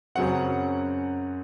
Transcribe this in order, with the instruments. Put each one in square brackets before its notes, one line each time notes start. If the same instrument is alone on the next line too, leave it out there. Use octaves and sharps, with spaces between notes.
[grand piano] F#2 C#3 F#3 C4 F#5